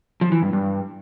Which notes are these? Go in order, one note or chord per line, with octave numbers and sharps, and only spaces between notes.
F3
E3
G2
G2